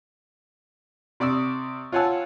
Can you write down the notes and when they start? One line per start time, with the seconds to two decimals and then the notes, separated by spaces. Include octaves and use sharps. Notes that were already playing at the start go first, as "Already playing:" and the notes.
1.20 C3 D5 C#6 D#6 E6
1.92 F4 C#5 F#5 G#5 A5 E6